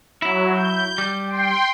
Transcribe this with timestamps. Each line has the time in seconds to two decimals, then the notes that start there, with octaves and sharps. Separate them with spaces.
0.22 F#3 E4
0.53 G6
0.98 G3
1.27 G5 C6